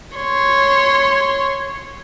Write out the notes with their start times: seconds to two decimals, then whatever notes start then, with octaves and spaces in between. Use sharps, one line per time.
0.16 C#5 C6